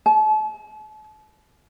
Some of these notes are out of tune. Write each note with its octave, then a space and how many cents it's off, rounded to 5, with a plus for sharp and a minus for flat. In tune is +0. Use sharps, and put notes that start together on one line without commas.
A5 -40